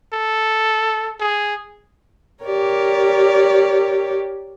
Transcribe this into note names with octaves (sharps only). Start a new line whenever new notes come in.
A4
G#4
G4 A#4 C#5 D5